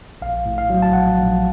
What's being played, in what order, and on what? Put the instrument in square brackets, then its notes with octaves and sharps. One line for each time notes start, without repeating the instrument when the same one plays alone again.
[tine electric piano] A#1 F5
A2
F5
F#3
A5
A#1 F#5
A#1